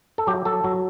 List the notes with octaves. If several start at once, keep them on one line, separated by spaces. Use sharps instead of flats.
A4
F#3 G4
F#3 A4
F#3